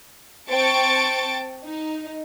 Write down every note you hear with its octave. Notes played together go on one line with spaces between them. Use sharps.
C4 G5 A5 C#6 A6 D7
D#4